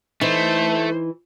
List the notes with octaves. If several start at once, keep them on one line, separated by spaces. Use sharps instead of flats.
E3 A3 D#4 C5